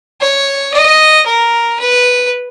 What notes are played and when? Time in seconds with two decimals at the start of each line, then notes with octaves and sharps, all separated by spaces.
0.21 C#5
0.74 D#5
1.26 A#4
1.80 B4